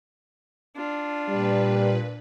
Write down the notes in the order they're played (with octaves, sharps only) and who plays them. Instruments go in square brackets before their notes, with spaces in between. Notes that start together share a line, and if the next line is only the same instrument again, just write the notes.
[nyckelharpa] D4 F4
[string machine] A#2 B4 [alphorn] G3